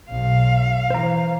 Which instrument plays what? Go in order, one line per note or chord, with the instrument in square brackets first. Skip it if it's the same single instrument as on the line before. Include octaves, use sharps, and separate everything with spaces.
[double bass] B1 [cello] F5
[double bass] E3 [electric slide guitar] C5 A#5